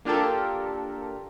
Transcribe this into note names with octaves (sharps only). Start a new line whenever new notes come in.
A#3 D4 F4 G4 A4 A#4